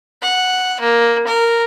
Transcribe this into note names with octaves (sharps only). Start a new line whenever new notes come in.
F#5
A#3
A#4